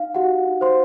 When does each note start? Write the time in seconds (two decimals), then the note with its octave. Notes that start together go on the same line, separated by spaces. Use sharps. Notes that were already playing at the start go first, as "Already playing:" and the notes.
Already playing: D#4 F5
0.15 F#4 G4 F#5
0.47 D#4
0.61 C5 C6